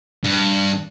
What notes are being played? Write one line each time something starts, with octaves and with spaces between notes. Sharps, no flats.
G2